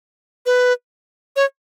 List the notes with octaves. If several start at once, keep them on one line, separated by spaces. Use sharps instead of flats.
B4
C#5